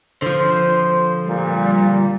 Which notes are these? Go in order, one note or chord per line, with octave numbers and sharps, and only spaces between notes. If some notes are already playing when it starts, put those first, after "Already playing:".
D3 F3 C5
A#2 G3